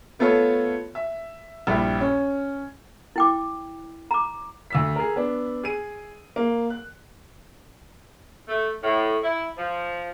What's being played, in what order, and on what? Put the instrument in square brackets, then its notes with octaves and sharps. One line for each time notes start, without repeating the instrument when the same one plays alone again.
[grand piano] A3 B3 F4 A4 C#5
E5
A#1 G2 G3 E4
C#4
[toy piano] E4 G5 D6
A#5 D6
[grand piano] D2 E6 B6
G#4 A#4
B3 D4
G#4 D#7
A#3
F#6
[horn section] A3
A2
E4
F3